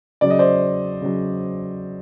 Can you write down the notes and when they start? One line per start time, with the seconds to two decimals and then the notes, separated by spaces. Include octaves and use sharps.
0.21 C#3 F#3 D5
0.30 D#5
0.39 C5 D5
1.02 C#3 F#3